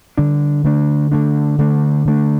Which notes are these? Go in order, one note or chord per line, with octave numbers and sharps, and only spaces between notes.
D3 G3 D4
D3 A3 D4
D3 A3 D4
D3 A3 D4
D3 A3 D4